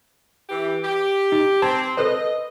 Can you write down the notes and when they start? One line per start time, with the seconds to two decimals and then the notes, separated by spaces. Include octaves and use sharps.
0.49 E3 G4
0.83 G4
1.32 D#4
1.62 C4 A5 C6 G#6
1.97 A4 B4 C5 D#5